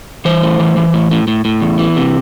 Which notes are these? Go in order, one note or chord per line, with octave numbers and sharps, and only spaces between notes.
E3 C5
A2
E3
E3
A2
A2
A2
A2
E2
E3
C3